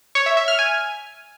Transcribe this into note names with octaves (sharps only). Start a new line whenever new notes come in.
C#5
E5
E5
F6
G#5